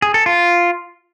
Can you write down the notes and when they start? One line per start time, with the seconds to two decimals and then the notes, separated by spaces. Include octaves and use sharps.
0.02 G#4
0.14 A4
0.26 F4